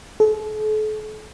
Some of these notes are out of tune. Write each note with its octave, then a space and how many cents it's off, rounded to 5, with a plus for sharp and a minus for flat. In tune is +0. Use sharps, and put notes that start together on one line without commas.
A4 -40